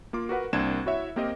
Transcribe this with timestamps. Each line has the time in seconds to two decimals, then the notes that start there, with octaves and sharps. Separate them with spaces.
0.13 A#3 F4 D6
0.29 F#4 A#4 B4 F#5
0.53 C2 A#3 C4 D4 G#6 E7
0.86 E4 F#4 C#5 E5
1.16 A#3 C4 G4 A#4 D#5